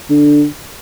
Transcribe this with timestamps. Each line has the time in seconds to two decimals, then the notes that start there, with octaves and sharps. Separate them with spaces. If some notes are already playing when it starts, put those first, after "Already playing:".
0.10 D3